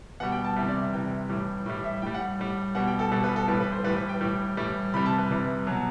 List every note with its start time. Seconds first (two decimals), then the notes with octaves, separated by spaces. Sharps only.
0.20 B2 G3 F#5
0.32 G5
0.44 A5
0.56 C3 E3 G3 E5
0.68 D5
0.81 E5
0.93 C3 E3 G3 G5
1.29 A2 E3 G3
1.66 A2 E3 G3
1.84 E5
2.02 A2 G3 G5
2.14 F#5
2.39 A2 G3
2.75 B2 G3 F#5
2.87 G5
2.99 A4
3.11 B2 G3 A4
3.24 B4
3.36 A4
3.48 A2 E3 G3 B4
3.60 B4
3.72 C5
3.84 A2 E3 G3 B4
3.96 B4
4.09 G5
4.21 A2 E3 G3
4.57 A2 E3 G3
4.94 C3 E3 G3 B5
5.06 A5
5.18 B4
5.30 C3 E3 G3
5.67 B2 F#3